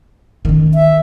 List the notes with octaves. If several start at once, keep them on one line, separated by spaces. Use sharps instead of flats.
D#3 C#4
E5